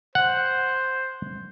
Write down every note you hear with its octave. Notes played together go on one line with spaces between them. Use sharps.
C5 F#5